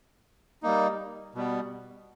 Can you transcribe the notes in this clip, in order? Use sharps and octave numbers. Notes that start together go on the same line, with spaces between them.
G3 A#3 D#4
B2 G3 B3